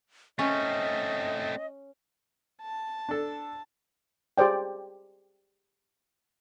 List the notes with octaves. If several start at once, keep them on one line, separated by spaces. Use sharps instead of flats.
A3 C4 C#4 D#5
A5
D4 A4
G4 G#4 C5 D5 G5